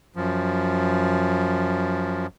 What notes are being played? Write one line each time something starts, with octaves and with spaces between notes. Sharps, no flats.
F#2 F3